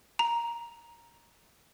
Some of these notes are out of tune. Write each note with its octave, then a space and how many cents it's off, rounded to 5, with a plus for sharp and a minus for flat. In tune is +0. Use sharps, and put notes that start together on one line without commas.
A#5 +5